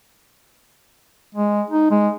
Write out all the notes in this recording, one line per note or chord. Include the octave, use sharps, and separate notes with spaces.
G#3
D#4
G#3